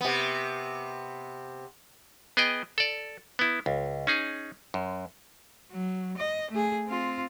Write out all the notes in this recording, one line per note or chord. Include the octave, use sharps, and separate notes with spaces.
C3 B3
B3 G#4 D#5 G5
A4 D5
B3 E4
C#2
C#4 D#4 G#4
F#2
F#3
D#5
A3 G#4
C4 F4